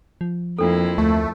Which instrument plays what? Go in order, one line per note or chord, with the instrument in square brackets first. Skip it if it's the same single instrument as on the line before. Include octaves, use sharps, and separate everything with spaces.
[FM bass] F3
[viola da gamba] F2 A#3 E4 [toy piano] D4 A4
[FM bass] D2 [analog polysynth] A3